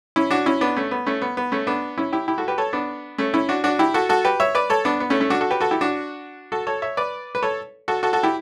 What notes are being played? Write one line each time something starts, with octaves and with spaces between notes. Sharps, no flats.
C#4 E4
D4 F#4
C#4 E4
B3 D4
A3 C#4
B3
A3 C#4
B3
B3
A3 C#4
B3 D4
C#4 E4
E4 G4
E4 G4
F#4 A4
G4 B4
A4 C#5
B3 D4
A3 C#4
C#4 E4
D4 F#4
D4 F#4
E4 G4
F#4 A4
F#4 A4
G4 B4
C#5 E5
B4 D5
A4 C#5
B3 D4
B3
A3 C#4
A3 C#4
D4 F#4
F#4 A4
G4 B4
F#4 A4
E4 G4
D4 F#4
F#4 A4
A4 C#5
C#5 E5
B4 D5
B4
A4 C#5
F#4 A4
F#4 A4
F#4 A4
E4 G4